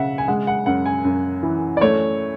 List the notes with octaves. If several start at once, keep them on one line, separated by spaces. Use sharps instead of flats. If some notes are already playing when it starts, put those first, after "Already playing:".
Already playing: C#3 E5 F#5
G#5
G#3 F#5
F#5
F#2 F#5
G#5
F#2
E3
D5
A3 C#5